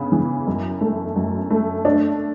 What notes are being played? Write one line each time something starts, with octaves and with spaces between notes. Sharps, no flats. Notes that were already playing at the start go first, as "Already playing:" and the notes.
Already playing: C#3 B3
E3
F#2
A3
F#2
A3
D4